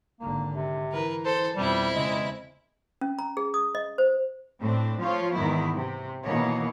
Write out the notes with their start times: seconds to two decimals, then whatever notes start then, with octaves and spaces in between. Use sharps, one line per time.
0.20 G#1 D3 A#3
0.55 C3
0.92 E3 A#4 B4
1.25 A4 C5
1.56 F2 B2 G3 C4 E4
1.94 E2 C#3 G#3
3.01 C#4
3.19 A#5
3.37 G#4
3.54 D#6
3.75 D#5
3.98 C5
4.61 A2 C4 D4
5.01 F3 A3 F4 C#5
5.34 E2 G#2 D#3 B3 E4
5.75 C3
6.26 B2 D#3 E3 A#3 C#5